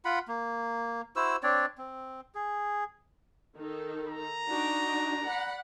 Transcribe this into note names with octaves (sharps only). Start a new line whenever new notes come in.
F4 F#5 B5
A#3
E4 F#4 C5 E6
C4 D4 C#5 D5
C4
G#4
D#3 D#4 A4
A#5
D4 D#4 F#4
D5 F#5 B5